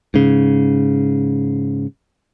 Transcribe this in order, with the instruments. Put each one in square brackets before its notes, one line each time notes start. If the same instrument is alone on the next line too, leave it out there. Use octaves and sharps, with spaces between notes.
[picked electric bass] G#2 C#3